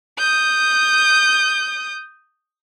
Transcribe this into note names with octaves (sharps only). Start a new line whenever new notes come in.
D#6 G6